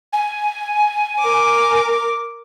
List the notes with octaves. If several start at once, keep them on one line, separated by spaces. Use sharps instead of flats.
G#5
A#4 D6